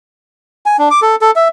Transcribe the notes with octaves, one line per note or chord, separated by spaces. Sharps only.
G#5
D4
D6
A4
A4
E5